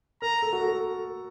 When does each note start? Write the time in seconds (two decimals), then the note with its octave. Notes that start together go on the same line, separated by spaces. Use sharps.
0.22 A#4 A#5
0.42 A4
0.53 F#4
0.63 A4